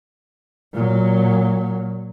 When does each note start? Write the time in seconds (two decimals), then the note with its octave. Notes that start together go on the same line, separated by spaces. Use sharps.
0.73 A#2 F#3